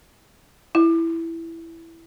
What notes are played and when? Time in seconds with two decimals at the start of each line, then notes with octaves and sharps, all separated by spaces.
0.75 E4